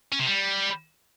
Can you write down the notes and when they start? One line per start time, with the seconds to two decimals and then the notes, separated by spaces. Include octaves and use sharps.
0.12 C#4
0.19 C3
0.26 G3